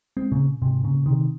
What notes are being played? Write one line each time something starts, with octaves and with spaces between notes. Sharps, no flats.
G#3 C4
A#2 C#3
G#2 C3
A#2 C#3
C3 D#3